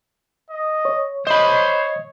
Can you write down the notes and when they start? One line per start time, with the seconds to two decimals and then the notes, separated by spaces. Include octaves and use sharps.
0.51 D#5
0.85 C#5
1.27 C5 C#5 D#5 B5